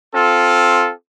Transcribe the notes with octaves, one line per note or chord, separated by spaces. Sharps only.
C4 F4 A4